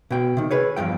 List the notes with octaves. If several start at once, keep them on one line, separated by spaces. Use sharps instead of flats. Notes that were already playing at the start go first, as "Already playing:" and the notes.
B2 G5
C3 D#3
G#4 B4 C#5
E2 G2 F3 G5